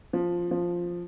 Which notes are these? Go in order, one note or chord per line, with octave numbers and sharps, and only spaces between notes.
F3
F3